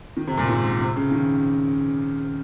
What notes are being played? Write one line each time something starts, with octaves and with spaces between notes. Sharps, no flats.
D#3
C3
A#2
G#2
C3
C#3
D#3